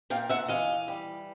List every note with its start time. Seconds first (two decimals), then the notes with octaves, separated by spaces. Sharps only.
0.10 A#2 F5 G5
0.29 E5 F#5
0.48 E3 D#5 F5
0.88 G3